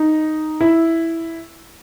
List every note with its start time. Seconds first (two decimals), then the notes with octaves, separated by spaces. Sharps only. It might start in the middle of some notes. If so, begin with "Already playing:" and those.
Already playing: D#4
0.61 E4